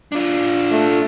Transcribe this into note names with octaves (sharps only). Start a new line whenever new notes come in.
D4 F4
A3